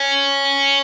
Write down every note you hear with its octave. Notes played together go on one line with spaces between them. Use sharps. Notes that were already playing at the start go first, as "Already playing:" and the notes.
Already playing: C#4